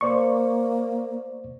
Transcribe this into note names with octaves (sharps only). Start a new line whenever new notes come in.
A#3 C5 D5 C#6